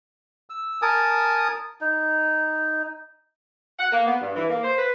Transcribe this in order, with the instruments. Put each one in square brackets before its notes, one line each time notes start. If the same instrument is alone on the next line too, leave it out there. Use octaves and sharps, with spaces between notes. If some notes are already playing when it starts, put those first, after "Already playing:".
[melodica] E6
A#4 G#5 A5 D#6
D#4
[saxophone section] F#5
A#3
B3
G2
E3
A#3
C5
B4